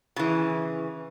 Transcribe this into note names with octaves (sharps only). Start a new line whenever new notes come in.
C#3 E3